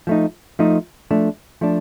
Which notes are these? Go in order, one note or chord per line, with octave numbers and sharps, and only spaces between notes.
F3 A3 D#4
F3 A3 D#4
F3 A3 D4
F3 A3 D4